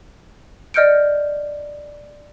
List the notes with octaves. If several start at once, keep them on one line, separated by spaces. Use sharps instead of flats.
D5 D#5 F6 G6 C#7 D7